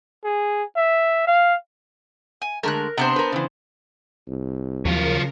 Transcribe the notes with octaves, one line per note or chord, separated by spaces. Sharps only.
G#4
E5
F5
G#5
D3 G#3 A3 A#4 F#6
C3 B3 D4 C5 A5
A#4 B4
C#3 E3
C2
D#2 C#3 F3 F#3 F4 A#4